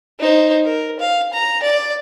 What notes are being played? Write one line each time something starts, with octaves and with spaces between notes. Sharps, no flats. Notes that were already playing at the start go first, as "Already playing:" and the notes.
D#4 C5
A#4
F5
A#5
D5